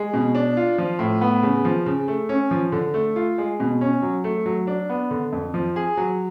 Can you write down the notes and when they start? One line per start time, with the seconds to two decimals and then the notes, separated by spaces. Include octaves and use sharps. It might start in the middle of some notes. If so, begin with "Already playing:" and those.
Already playing: G#3
0.14 B2
0.35 D4
0.57 F4
0.78 F3
0.99 A2
1.21 B3
1.43 C#3
1.65 F3
1.86 C#3
2.08 A3
2.29 C#4
2.51 F3
2.72 D3
2.94 A3
3.16 F4
3.38 G#3
3.60 B2
3.81 C#4
4.02 F#3
4.24 A3
4.46 F#3
4.67 D4
4.89 B3
5.11 D3
5.32 F2
5.54 F3
5.76 G#4
5.97 F#3